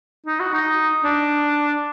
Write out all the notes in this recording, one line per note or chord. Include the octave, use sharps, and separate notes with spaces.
D#4
F#4
D#4
D4